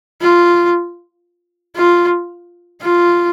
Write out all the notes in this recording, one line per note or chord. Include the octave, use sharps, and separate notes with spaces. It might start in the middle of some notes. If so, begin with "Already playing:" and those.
F4
F4
F4